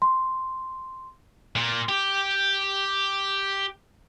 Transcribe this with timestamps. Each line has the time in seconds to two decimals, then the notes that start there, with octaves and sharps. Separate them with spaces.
0.02 C6
1.56 A#2
1.89 G4